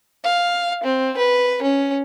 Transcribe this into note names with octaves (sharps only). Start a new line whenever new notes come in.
F5
C4
B4
C#4